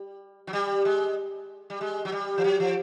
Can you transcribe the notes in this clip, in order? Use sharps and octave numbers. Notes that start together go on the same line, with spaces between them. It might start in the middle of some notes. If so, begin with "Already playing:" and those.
Already playing: G3
F#3
G3
G#3
G3
G#3
F#3
G3
F3
F#3
F3